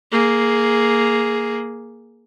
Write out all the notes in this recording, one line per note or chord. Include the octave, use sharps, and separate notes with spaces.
A#3 G#4